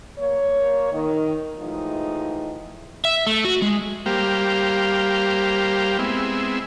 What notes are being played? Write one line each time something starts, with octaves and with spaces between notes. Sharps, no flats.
A#3 C#5
D#3
A2 E3 F3 G#3 D#4
E5
A3
F#4
G#3
G3 A#3 G4 C5 F5
G#3 B3 C4 E4